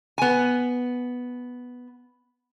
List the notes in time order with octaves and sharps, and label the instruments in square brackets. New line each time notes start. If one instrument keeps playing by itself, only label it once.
[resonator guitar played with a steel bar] B3 G#5